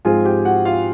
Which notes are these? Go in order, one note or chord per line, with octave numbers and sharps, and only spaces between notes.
G#2 F3 G#3 C4 F4 G#4 G#5
G4 G5
F#4 F#5
F4 F5